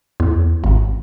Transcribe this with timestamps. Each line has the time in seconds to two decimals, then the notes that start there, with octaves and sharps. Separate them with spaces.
0.20 E2
0.64 G#1